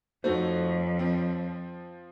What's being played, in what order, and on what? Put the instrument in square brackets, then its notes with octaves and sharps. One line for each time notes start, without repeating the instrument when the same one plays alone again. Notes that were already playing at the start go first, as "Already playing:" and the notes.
[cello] F2 [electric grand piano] A3 D#4 F#4 [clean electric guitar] C5 C#5
[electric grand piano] F3 C4